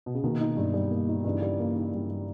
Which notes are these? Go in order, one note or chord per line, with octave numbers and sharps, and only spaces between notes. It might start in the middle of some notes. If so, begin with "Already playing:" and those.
B2
C#3
B2 D#3 A#3
D#4
G2
G3
A#3
D#4
G2 C#3 E3
G3
A#3
D#4
G2
G3